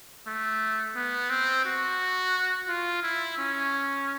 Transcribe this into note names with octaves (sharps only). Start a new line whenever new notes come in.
A3
B3
C4
F#4
F4
E4
C#4